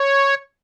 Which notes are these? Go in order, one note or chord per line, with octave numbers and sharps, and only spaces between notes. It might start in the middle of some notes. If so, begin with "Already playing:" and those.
Already playing: C#5